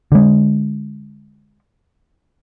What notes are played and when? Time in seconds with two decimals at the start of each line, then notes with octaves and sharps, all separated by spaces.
0.12 D3 G#3